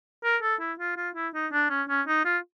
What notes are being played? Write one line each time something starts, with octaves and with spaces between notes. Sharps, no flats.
A#4
A4
E4
F4
F4
E4
D#4
D4
C#4
C#4
D#4
F4